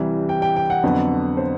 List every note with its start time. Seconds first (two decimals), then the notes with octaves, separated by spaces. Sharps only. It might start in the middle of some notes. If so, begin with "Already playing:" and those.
Already playing: C2 C3 E3 G3
0.29 G5
0.42 G5
0.56 G5
0.70 F#5
0.84 F2 D3 F#3 B3
1.37 C5